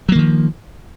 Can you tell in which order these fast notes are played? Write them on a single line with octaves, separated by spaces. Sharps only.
F#3 A#3 D#3 F3